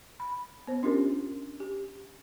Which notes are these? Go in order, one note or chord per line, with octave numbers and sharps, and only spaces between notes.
B5
B3 C5
C#4 D4 F4 G4 A#4
G4